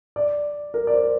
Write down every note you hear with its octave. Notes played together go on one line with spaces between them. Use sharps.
D5
A#4
D5
C5